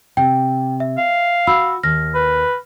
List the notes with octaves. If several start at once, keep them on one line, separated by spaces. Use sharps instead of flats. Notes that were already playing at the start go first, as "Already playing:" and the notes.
C3 G5
E5
F5
F#4 B5 E6
D#2 F6 A#6
B4